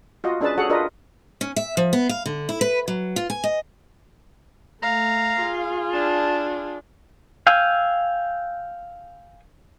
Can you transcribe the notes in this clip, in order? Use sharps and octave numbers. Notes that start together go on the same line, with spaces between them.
F4 F#4 D#5
C#4 D4 G#4 B4 A5
F#4 G#4 A4 C#5 F#5
D4 F4 G#4 A#4 B4 D#5
C#4
E5
F3
B3
F5
D3
E4
B4
F#3
F4
G#5
D#5
A3 F5 A#5
F4 G#4
D4 A5
F5 G5 G#5 E6